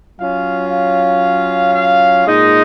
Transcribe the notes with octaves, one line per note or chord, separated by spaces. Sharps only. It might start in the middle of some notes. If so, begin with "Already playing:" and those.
F#3 C#4 F4 F5
F5
F5
A#2 G#3 D#4 D#5